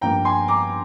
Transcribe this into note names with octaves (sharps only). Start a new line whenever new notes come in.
G2 F3 A#3 G5 A#5
G#5 C6
A#5 D6